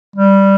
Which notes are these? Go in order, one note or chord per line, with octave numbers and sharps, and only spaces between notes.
G3